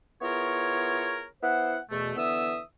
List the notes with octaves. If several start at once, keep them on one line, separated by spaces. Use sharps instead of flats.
B3 E4 F4 G#4 A#4 C#5
B3 E4 C5 F#5
E2 B2 A3
D3 E3 B3 E5 D#6 E6